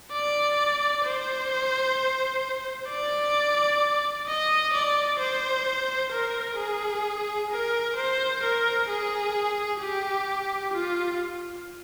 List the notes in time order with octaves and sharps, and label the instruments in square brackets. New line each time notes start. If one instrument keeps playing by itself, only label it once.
[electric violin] D5
C5
D5
D#5
D5
C5
A#4
G#4
A#4
C5
A#4
G#4
G4
F4